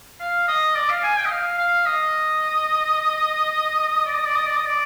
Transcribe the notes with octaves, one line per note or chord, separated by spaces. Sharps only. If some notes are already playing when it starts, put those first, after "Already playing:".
F5
D#5
D5
F5
G#5
G5
D#5
F5
F5
D#5
D5
D#5
D5
D#5
D5
D#5
D5